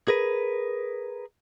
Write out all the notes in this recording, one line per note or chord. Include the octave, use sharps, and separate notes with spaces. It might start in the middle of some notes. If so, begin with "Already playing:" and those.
G#4 A#4 B4